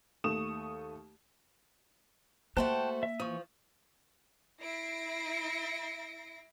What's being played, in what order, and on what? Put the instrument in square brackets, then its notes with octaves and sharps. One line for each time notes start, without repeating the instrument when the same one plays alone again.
[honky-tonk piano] D#2 A3 C#6 D#6 E7
[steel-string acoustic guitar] A3 F#4 C5 [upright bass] A#3 [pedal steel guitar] G5 A5 F#6
[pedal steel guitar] E5
[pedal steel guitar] E3 C#6 D#6 [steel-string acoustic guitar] F3
[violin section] E4 E5 A#6 C7 D7